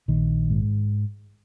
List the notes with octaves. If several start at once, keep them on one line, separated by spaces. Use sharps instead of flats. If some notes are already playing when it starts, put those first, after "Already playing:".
A#1 D#3
G#2